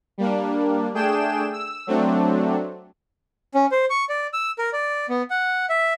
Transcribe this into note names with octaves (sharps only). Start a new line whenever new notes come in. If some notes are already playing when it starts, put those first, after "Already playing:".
G3 A#3 D4
A3 D4 G#4 G5 E7
E6
F#3 A3 C4 D4
C#4
C5
C#6
D5
E6
A#4
D5
B3
F#5
E5